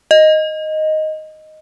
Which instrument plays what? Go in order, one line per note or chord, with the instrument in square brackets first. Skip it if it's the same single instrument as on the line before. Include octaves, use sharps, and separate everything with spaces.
[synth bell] D#5